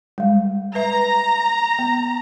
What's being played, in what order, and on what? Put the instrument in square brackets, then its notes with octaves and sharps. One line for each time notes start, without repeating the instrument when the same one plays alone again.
[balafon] G3 G#3
[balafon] B4 E5 [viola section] A#5
[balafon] B3